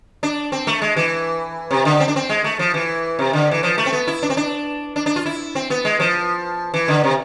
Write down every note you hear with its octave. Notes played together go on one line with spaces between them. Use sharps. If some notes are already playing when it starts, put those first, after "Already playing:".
D4
C4
A3
G#3
E3
C3
D3
C4
D4
C4
G#3
A3
F3
E3
C3
D3
E3
F3
A3
C4
B3
E4
D4
C4
D4
D4
D4
F4
E4
C4
B3
G#3
F3
E3
D3
C3